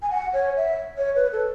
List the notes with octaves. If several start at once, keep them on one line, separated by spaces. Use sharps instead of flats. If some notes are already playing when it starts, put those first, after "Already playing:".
G#5
F#5
C#5
E5
C#5
B4
A4